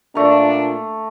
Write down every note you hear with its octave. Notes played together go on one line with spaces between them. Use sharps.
A#2 A3 D4 A#5